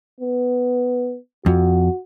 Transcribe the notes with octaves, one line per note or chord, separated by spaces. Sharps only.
B3
F2 F#4